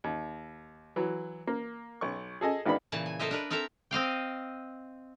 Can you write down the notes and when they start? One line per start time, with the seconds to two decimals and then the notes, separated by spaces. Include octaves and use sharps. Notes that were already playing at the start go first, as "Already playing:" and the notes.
0.04 D#2
0.96 E3 F#3
1.47 A#3
2.01 B1 C#6
2.41 G#4 A4 D#5 G#5
2.65 G#1 D#3 B3 D4 B5
2.92 A#2 C#3 E3 A5
3.06 G#5
3.19 A4 A#4 C5 D#5 E5
3.31 D4 A#4 B4
3.51 C4 A4 A#4 E5 A#5
3.91 C4 D#5 F5 G5